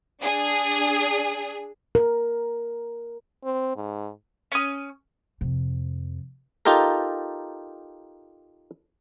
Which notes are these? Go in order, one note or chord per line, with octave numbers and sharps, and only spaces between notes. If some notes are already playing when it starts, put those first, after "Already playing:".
D4 G#4
A#4
C4
G#2
C#4 D#6
F2 C3
D#4 F4 G4 A4 A#4